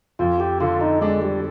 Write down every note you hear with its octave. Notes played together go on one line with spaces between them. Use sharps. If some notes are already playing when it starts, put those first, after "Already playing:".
F2 F4
G4
D3 F4
D#4
G#3 D4
G3